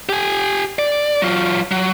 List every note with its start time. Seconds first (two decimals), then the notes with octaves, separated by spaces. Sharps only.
0.09 G4 G#5
0.79 D5
1.22 F#3 F4
1.71 F#3